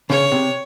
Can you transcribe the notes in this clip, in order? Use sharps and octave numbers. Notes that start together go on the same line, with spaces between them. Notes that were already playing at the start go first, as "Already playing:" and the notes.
C#3 C#5
C3